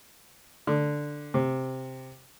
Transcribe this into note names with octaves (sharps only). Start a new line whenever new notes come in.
D3
C3